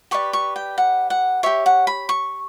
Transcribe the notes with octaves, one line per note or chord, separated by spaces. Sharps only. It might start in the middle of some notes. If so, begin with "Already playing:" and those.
G4 B4 D5 C#6
C#6
G5
F#5
F#5
G4 C#5 E5
F#5
B5
C#6